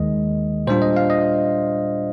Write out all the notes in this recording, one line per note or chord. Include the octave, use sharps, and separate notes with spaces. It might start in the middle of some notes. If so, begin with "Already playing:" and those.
Already playing: D#2 D#3 G#3 D#5
A#2 G3 D4 F4 C5
D#5
F5
D#5